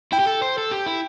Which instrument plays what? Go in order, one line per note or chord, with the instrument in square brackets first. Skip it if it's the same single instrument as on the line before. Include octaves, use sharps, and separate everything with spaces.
[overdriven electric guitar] E4 [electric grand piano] G5
[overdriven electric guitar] G4
A4
C5
A4
G4
E4